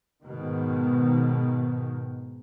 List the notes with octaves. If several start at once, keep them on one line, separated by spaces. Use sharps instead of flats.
G#2 B2 D#3